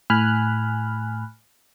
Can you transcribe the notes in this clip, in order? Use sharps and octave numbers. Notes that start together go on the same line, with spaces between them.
A2 G#5 B5 F6 F#6